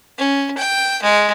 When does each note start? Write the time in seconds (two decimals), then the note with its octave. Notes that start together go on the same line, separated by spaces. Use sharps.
0.18 C#4
0.57 G5
1.03 G#3